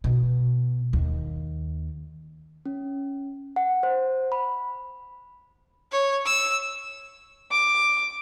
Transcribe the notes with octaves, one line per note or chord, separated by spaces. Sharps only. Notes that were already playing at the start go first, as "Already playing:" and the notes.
B2
D#2
C#4
F#5
C5
B5
C#5
E6
D6